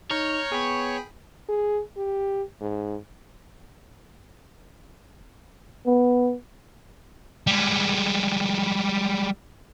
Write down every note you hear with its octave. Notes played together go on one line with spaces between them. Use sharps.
D#4 C#5 A#5 F6 G6
B3 G#4 G5 B5
G#4
G4
G#2
B3
G3 G#3